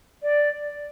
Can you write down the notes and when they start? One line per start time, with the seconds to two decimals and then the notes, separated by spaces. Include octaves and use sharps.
0.23 D5